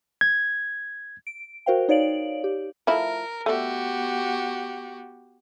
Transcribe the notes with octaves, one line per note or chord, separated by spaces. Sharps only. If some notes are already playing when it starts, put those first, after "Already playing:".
G#6
D7
F#4 A#4 C5 F5 G5
D#4 C#5 D5 F5 D7 F#7
G4
F3 A3 E4 A#4
A3 B3 F#4 G4 D5